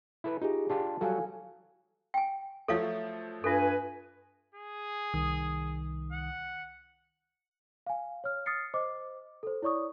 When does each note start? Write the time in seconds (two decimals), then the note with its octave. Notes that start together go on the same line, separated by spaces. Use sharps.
0.24 E4 A4 B4
0.42 D#4 F4 G4 G#4
0.70 D4 F4 G4 A5
1.01 F#3 G3 F#4 A4 F5 G#5
2.14 G5 G#5
2.68 F3 F#3 A3 A4 C#5 F5
3.44 G2 F4 A4 B4 G#5
4.54 G#4
5.14 C2 D#3 D#6
6.12 F#5
7.87 F5 G#5
8.24 C#5 F6
8.46 D#6 F6 A6 C7 C#7
8.74 C5 D#5 D6
9.43 A4 C5
9.62 E4 C#5 D5 C#6 D#6